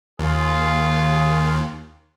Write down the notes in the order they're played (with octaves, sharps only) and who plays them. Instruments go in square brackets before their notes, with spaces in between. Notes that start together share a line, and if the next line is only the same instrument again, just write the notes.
[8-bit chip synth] D#2 [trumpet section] F4 G#4